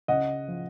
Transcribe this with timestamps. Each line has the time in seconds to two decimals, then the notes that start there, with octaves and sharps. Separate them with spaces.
0.08 C#3 D#5 F#5
0.48 F3